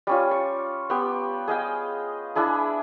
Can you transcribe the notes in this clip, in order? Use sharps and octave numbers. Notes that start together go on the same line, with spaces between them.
G3 C#4 F4
C#6
B3 G4
G#4 D#5 F5 G5
D4 E4 G#4 B5